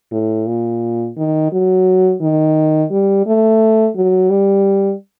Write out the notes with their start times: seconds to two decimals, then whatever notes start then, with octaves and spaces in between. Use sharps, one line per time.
0.12 A2
0.47 A#2
1.18 D#3
1.52 F#3
2.21 D#3
2.91 G3
3.26 A3
3.96 F#3
4.30 G3